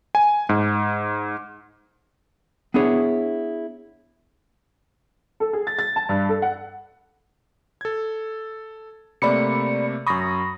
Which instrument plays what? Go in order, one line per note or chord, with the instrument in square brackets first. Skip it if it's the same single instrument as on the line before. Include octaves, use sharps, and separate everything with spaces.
[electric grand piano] G#5
G#2
[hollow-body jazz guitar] B3 D4 E4 G#4 C#5
[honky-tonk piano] A4
G#4
A6
A6
A5
G2
A4
F#5
[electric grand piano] A4 G#6
[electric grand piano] C3 A3 A#3 [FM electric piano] D5 B5 C#7
[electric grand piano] F#2 D#6 [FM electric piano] B5 C#6 A#6